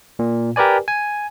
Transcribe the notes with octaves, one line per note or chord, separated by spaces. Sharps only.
A#2
G4 A#4 B4 D5 G#5
G#5